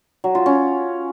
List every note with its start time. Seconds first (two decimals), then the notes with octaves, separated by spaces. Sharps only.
0.24 F#3
0.35 F4
0.46 C#4